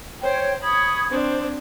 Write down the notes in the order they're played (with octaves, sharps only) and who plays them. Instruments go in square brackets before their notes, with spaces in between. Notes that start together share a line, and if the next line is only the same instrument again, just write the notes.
[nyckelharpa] C5 [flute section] C#5 G5
[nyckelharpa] B5 C#6 [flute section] D#6 G#6
[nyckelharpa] C4 D4 [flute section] C5